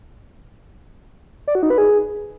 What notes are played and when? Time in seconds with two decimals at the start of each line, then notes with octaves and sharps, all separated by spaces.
1.48 D5
1.55 F#4
1.63 D#4
1.70 B4
1.78 G#4